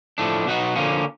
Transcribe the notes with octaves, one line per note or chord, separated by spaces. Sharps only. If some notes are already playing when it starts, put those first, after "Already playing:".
A2 F3 A3 D4
B2 F#3 B3 D#4 F#4
D3 F3 A#3 C#4